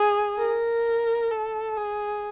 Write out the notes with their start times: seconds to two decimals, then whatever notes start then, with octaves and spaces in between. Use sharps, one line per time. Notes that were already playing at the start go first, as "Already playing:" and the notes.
Already playing: G#4
0.38 A#4
1.31 A4
1.77 G#4